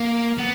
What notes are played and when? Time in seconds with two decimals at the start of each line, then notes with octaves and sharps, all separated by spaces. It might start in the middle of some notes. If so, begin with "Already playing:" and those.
Already playing: A#3
0.38 B3